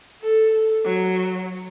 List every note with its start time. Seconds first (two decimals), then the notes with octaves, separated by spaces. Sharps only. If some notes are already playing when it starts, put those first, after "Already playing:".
0.22 A4
0.84 F#3